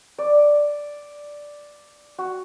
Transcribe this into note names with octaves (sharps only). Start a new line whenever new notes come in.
D5
F#4